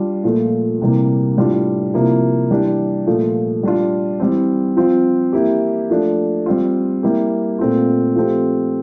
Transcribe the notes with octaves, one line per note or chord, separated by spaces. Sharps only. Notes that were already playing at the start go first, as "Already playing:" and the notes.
Already playing: G3 D4 F4
A#2 F3 A3
C3 E3 G3 A#3
A2 G3 D4 F4
C3 F3 A#3 E4
E3 G3 D4 G4
A#2 F3 A3
G3 D4 F4
E3 G3 C4
F3 C4 F4
E3 A#3 E4 G4
F3 A3 D4
G3 C4 F4
G3 A#3 E4 G4
A#2 A3 C4 F4
F3 A3 C4 G4